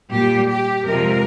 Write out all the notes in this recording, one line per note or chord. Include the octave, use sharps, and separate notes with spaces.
A#2 G3 G4
G4
F2 C3 F3 G#3 A#4